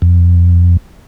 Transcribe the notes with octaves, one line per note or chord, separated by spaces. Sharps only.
F2